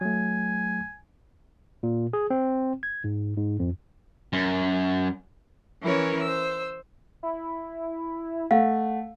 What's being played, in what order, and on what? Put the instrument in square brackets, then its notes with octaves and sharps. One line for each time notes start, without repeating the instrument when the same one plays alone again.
[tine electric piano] F#3 A3 [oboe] G#5
[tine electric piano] A#2
G#4
C4
G#6
G#2
G#2
F2
[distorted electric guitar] F#2
[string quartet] E3 C#4 E4 A#4 B4 C#5
C5 E6
[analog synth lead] E4
[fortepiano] A3 [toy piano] F5 [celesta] F#5